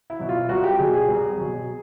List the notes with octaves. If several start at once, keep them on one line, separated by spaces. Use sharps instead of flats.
E4
B2 F#3
F4
C2 F#4
G4
B2 F#3 G#4
G#4
C2
B2 F#3